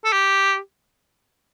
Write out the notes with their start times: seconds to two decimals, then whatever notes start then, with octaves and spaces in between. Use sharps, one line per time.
0.05 A4
0.13 G4